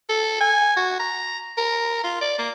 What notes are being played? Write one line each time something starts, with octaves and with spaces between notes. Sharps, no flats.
A4
G#5
F#4
A#5
A#4
F4
D5
A#3